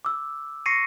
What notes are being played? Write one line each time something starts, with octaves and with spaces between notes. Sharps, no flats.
D6 E6
C#6 A#6 C7 C#7 D#7